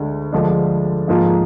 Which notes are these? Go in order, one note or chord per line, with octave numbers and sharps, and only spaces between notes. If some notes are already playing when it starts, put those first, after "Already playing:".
Already playing: D2 D3 G#3
D2 D3 F3 G#3 D4
G#2 F3 A#3 F4 G#4